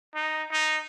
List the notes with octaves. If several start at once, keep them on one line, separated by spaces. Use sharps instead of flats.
D#4
D#4